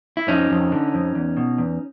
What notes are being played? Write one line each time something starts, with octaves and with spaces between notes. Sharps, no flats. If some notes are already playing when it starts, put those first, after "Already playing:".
E4
F2 C#4 D#4
F2
D3
F2
E2
B2
E2